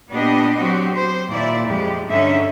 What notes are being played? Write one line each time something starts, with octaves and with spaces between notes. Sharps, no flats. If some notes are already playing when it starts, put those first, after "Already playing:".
A#2 B3 D4 G4 D#5
F#3 C4 F#4 G4
C5
D#2 A#2 E4 D5
F2 G#3 G4
G2 D3 C#4 D#4 E5